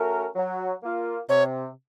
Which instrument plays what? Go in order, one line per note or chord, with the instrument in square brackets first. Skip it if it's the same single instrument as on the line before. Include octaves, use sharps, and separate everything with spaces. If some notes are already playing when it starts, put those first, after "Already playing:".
Already playing: [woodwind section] A3 C#4 F#4 A#4
F#3
A#3 F4
[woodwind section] C3 [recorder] C#5